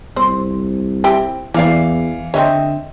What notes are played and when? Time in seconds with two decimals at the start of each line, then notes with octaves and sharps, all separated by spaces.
0.16 C2 C4 C5
1.04 C4 E4 G4
1.54 E2 E3 A#3 D5 F5 C7
2.34 D3 C4 B4 C#5 D#5 E5